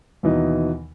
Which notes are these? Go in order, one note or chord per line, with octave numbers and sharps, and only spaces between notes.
D#2 B2 E3 D#4